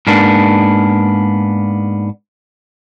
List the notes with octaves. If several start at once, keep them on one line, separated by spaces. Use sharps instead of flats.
G#2 A#3 B3 D4